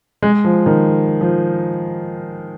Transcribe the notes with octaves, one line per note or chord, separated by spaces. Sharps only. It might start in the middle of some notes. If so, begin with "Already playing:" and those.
G#3
F3
D#3
F3